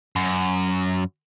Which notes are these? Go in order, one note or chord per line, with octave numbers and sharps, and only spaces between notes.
F#2